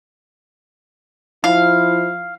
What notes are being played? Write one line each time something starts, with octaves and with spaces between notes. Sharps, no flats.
F3 E4 F5